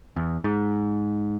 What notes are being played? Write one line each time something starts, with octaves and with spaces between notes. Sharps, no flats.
E2
G#2